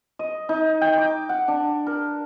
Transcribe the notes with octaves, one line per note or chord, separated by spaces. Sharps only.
D#5
D#4
G5
D6
F#5
D4
A#4